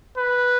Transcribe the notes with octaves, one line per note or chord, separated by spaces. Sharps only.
B4